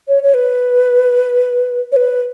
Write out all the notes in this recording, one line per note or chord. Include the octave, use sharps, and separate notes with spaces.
C#5
C#5
B4
C#5
B4